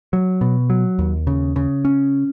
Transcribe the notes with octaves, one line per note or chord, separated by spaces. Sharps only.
F#3
B2
F#3
D#2
C#3
C#3
C#4